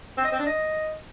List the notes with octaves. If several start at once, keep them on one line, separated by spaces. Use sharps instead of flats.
C4
D#5
C4
D4
D#5